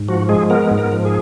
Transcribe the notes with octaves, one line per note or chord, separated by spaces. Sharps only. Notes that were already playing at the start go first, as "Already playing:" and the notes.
Already playing: G#2
F3 F#4
G#3 G#4
B3 A#4
G#2
A#4
F3
G#4